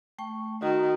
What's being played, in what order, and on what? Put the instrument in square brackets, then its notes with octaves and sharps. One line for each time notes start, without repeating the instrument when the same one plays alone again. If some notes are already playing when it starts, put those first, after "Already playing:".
[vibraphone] A3 G5 C#6
[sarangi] D#3 [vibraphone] F#4 A#5